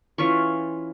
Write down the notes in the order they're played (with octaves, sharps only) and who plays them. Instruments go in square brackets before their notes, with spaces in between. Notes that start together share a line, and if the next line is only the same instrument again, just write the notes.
[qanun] E3 C#4 F4 C#6